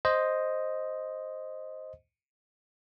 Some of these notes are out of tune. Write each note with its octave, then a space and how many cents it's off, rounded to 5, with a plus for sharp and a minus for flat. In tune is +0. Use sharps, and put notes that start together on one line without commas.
C5 +0 D#5 +0